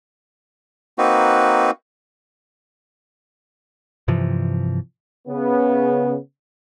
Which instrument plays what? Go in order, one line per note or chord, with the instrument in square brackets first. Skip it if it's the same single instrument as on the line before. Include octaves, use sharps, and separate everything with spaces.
[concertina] A#3 C4 D#4 F#4 B4
[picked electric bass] G2 C3 E3 F3
[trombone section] C#3 B3